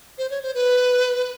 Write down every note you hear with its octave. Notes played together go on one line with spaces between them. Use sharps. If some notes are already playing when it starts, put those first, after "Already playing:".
C5
C#5
C5
B4